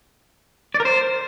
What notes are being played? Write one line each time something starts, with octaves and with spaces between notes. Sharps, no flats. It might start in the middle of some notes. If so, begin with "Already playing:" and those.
D5
A#4
C5